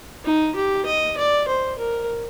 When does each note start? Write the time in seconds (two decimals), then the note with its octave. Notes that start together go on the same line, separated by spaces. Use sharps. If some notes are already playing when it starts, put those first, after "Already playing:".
0.25 D#4
0.56 G4
0.86 D#5
1.17 D5
1.48 C5
1.79 A#4